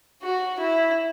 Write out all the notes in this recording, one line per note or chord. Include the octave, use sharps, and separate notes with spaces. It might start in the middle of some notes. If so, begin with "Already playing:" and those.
F#4
E4